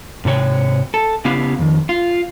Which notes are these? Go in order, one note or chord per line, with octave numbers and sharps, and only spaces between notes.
G#2 C3 A4 C#5 G5
A4
C#3 B3 E4 G4 F5
F2 D#3
F4